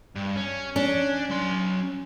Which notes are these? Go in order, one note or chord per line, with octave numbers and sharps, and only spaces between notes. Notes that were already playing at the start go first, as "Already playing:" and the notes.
G2
C#4
C#4 D4
F#3 C6